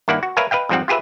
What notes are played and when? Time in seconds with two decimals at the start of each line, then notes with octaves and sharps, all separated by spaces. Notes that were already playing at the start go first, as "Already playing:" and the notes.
0.08 G2 D#3 A#3 E4 D5 F#5
0.23 F#4
0.37 A#4 B4 C#5 E5 F5 G#5
0.51 B4 D#5 F5 G5
0.69 F2 G#2 F3 G3 C4 F#5
0.88 F4 G4 G#4 B4 E5